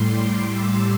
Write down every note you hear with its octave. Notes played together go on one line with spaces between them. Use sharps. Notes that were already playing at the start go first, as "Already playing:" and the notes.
Already playing: A2 G3 C6
D6
E6